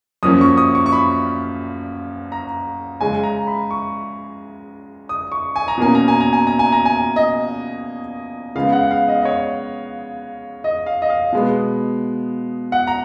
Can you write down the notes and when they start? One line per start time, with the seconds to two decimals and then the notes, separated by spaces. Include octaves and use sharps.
0.23 F#2 F3 A#3 C#4 D#6
0.41 C#6
0.57 D#6
0.75 C#6
0.86 C#6
0.92 B5
2.32 A#5
3.01 C#3 G#3 C#4 G#5
3.23 A#5
3.47 B5
3.71 C#6
5.09 D#6
5.32 C#6
5.56 G#5
5.68 A#5
5.78 B2 A#3 C#4 G#5
5.95 A#5
6.08 G#5
6.20 A#5
6.33 G#5
6.47 A#5
6.59 G#5
6.72 A#5
6.85 G#5
7.16 D#5
8.56 C#3 G#3 B3 F5
8.72 F#5
8.83 F#5
8.91 F5
9.08 D#5
9.21 D#5
9.25 C#5
10.64 D#5
10.86 F5
11.02 D#5
11.10 F5
11.32 B2 G#3 B3
12.72 F#5
12.87 A#5